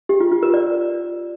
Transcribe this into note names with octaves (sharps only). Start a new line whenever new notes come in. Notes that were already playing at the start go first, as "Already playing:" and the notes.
G4
F4
F4
A#4
D5